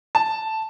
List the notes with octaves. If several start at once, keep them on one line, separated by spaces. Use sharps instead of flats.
A5